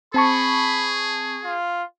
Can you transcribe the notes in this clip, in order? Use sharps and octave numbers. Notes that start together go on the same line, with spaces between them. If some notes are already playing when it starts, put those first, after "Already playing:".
C4 G#4 A5 B5 C#6
F4